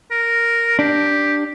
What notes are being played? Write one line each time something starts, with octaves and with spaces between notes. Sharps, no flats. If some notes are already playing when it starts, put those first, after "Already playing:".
A#4
D4 G4